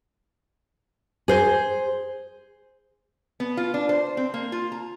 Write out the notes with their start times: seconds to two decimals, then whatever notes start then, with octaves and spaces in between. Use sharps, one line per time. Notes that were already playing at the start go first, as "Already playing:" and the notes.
1.28 G#4 C5
3.40 B3
3.57 F4
3.74 D4
3.89 C5
4.17 C4
4.34 A#3
4.52 F4
4.72 A#5